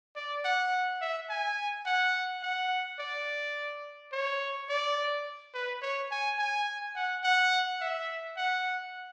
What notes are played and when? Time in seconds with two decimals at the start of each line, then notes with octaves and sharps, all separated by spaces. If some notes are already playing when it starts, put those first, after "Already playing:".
0.16 D5
0.45 F#5
1.01 E5
1.29 G#5
1.86 F#5
2.43 F#5
2.99 D5
4.12 C#5
4.69 D5
5.54 B4
5.82 C#5
6.11 G#5
6.39 G#5
6.96 F#5
7.24 F#5
7.81 E5
8.37 F#5